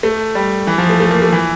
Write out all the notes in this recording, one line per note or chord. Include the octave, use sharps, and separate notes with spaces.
A3
G3
E3
F3
A3
A3
A#3
A3
E3